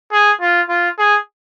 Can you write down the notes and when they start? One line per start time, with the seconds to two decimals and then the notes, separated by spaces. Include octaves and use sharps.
0.12 G#4
0.41 F4
0.69 F4
0.98 G#4